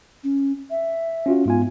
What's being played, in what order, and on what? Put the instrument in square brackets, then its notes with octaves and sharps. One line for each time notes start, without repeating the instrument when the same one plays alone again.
[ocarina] C#4
E5
[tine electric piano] C#4 F4 F#4
[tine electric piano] G#2 F4 G#5 [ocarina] B3